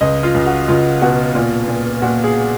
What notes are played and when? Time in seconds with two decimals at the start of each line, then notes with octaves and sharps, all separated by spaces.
0.01 C#2 D#5
0.23 F4
0.34 C#2
0.46 F#4
0.68 C#2 F4
1.01 B2 F#4
1.35 A#2 F4
1.68 A#2
2.02 A#2 F#4
2.24 G#4